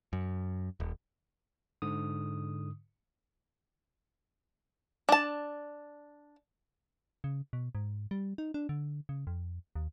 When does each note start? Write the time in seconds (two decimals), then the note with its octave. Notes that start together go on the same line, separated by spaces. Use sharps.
0.13 F#2
0.80 D#1
1.82 G#2 D3 D#6
5.09 D4 A5
7.24 C#3
7.53 B2
7.75 G#2
8.11 G3
8.38 D#4
8.54 D4
8.69 D3
9.09 C#3
9.27 F2
9.76 D#2